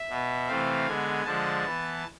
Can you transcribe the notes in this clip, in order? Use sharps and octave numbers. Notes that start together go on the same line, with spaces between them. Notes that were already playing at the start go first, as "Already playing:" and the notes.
Already playing: E5
B2 B3
C3 E3 A3 C4 F5
D3 G#3 B3 G#5
D3 F3 G#3 A5
E3 B3